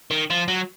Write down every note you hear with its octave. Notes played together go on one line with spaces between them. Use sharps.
D#3
F3
F#3